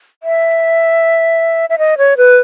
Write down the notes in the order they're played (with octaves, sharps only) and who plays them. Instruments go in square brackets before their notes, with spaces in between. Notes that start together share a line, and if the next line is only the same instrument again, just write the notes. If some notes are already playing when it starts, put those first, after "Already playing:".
[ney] E5
E5
D#5
C#5
B4